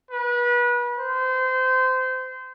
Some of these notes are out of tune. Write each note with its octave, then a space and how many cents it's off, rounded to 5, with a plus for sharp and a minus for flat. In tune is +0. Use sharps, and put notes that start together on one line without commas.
B4 -30
C5 -25